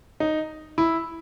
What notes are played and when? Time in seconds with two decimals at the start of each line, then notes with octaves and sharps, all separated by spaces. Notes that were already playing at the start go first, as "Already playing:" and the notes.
0.20 D#4
0.78 E4